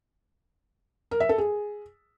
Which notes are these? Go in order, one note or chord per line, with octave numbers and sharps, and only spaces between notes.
A#4
E5
A4
G#4